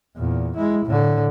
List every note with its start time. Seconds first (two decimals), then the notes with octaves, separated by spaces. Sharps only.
0.17 E2 A#2
0.57 G#3 E4
0.86 A2 D3